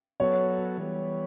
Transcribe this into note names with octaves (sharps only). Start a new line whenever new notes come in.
F#3 B3 F#4 A4 C#5
E3 G3 B3